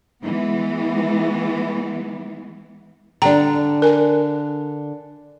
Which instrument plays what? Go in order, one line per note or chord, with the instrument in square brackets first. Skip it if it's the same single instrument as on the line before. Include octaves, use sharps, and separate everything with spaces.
[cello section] E3 G#3 B3
[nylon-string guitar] D3 D4 [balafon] G5 A#5
[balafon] A#4 G#5